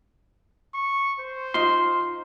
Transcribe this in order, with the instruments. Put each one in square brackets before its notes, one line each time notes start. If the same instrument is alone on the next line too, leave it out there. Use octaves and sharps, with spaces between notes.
[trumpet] C#6
C5
[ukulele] D#4 F4 [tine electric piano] C6